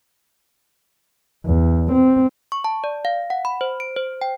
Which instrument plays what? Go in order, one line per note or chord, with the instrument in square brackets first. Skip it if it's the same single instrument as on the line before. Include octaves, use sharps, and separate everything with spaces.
[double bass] E2
C4
[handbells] C#6
A5
D5
F5
F#5
B5
C5
D7
C5
G5